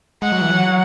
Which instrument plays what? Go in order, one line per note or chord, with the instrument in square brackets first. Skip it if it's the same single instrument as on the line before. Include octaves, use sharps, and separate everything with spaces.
[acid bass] G#3 [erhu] F#5
[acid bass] F#3
E3
F#3